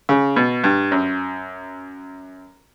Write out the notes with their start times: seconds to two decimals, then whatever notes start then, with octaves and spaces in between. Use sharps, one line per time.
0.09 C#3
0.36 B2
0.64 G2
0.91 F#2